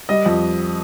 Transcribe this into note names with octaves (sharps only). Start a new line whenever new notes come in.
G3 D#5
F2